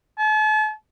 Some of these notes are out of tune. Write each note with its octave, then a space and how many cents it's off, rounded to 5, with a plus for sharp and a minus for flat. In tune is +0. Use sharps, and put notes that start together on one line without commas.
A5 -40